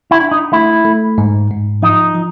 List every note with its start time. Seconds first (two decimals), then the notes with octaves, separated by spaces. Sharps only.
0.11 E4
0.20 D4
0.31 D#4
0.53 A3 E4
0.85 A3
1.18 G#2
1.50 G#2
1.82 F3 D#4
2.14 F3